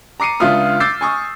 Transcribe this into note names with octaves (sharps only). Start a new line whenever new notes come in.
A#5 D6 C7 C#7 D#7
C#2 D4 F4 E5 D#6 F6
D6 E6 G6 A6 C7
G#5 C#6 D#6